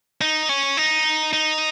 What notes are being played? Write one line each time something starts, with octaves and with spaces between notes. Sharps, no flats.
D#4
C#4
D#4
D#4